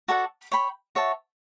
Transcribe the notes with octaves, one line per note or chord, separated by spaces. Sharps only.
F#4 A4 D5 F#5
C#5 G5 B5
F#4 C#5 E5 A5